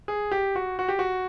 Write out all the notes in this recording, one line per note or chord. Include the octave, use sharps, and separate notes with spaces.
G#4
G4
F#4
F#4
G4
F#4